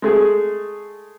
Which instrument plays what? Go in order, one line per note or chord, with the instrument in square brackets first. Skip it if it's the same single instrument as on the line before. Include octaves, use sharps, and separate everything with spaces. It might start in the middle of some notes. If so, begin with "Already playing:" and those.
[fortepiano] G#3 A3 G#4